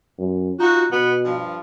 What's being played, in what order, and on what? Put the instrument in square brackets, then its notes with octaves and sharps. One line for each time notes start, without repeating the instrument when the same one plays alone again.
[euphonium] F#2
[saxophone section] D#4 F#4 [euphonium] F4
[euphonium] B2 [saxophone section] B3
[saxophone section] G2 F3